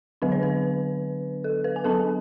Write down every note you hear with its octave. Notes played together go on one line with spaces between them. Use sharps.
D3 F#3 B3 D4 B4
C#5
B4
A4
B4
G#5
F#3 B3 D4 A4 A5